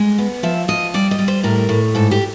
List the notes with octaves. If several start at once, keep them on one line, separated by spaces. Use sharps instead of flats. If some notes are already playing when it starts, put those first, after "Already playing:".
Already playing: G#3
B3
F3 E5
F3 D#5
G3 D5
D#5
G3
C5
A2 A#4
A2
G#2 A4
G4